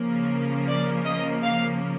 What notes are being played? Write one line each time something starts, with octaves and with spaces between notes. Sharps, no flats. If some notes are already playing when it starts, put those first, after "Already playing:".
Already playing: C#3 F3 A#3
D5
D#5
F5